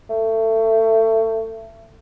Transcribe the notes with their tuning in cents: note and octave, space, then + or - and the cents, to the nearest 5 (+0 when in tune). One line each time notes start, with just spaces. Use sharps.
A3 +25